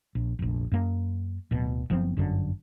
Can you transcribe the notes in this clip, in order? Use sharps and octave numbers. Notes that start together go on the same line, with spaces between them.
A#1
F1 A#1
F#2 A#3
D1 B2
F#1 F3 B3 C4
G1 F#2 D3